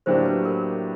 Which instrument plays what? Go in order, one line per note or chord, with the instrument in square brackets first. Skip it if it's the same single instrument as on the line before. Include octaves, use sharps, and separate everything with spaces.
[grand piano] A2 F#3 A#3 D4 G4 [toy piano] C5
[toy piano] B4
A#4